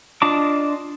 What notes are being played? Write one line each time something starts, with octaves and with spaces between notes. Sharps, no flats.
D4 F4 D#5 A5 D6